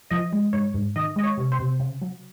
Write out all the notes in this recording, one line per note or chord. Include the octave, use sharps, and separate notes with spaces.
F3 D#5
G#3
G#2 C#5
G#2
D#3 D#5
G#3 D#5
C#5
C3
C5
C3
C#3
F#3